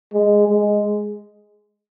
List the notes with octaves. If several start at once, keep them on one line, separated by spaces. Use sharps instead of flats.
G#3
G#3